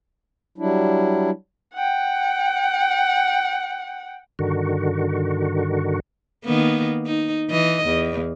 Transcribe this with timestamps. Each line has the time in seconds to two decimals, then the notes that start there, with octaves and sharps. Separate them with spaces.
0.58 F#3 G3 D4 E4
1.74 F#5 G5
4.39 G2 D3 D#3 F#4
6.45 D#3 A#3 B3
7.06 D#4
7.49 E3 D#5
7.85 E2